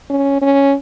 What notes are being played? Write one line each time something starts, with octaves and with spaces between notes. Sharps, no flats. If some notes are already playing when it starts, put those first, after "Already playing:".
C#4
C#4